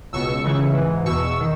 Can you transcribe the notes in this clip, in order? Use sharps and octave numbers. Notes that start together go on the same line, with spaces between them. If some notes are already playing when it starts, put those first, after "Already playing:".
C#2 B2 C#6 E6
C#2 C#3 E3
G#2 E3
E2 B2 C#6 E6
D#3